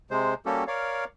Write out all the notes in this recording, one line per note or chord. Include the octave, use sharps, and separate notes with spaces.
C3 G#3 C5
G3 A#3 C#4 F#4 G4 A4
A#4 C#5 D5 F5